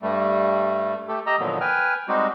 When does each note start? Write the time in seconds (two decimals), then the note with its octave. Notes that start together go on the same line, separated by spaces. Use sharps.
0.02 G2 G3 A3
1.08 A3 G4 A4
1.26 G4 D#5 A#5 E6
1.39 A#2 D3 D#3 F3 F#3 B3
1.61 B4 G5 G#5 F6
2.08 G3 G#3 C4 D#4 F#4 G4